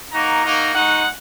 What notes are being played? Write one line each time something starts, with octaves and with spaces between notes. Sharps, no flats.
A#3 D#4 F#4 A#5
A#3 D#4 F#4
G#3 D#4 F#4 F#5